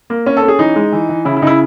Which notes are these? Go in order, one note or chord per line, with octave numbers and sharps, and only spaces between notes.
A#3
C#4
A4
C#4
G#4
E3 D#4
G#3
E3
E3
C#3 E4
E4
C#3 D#4 E4